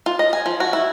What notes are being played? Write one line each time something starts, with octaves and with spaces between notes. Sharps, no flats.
F4
D#5
G#5
F3
F#4
E4